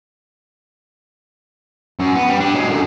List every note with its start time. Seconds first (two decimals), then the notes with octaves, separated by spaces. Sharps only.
2.00 F#2
2.15 B3
2.29 G3
2.41 D4 G4
2.55 F#3 G#3
2.70 F#2 D3